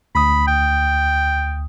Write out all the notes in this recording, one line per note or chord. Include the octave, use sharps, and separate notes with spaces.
D2 B5 D#6
G5